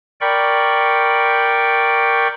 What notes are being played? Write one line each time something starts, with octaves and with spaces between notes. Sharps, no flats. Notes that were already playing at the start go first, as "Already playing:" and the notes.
A#4 D5 G5 B5 C#6